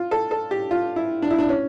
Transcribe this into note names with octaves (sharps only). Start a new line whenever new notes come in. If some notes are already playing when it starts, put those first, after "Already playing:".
Already playing: F4
A4
A4
G4
F4
E4
D4
E4
D4
C#4